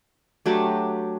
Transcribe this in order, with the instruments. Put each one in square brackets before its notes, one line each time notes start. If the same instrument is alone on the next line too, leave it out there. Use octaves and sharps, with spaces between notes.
[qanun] F#3 A3 D4 G4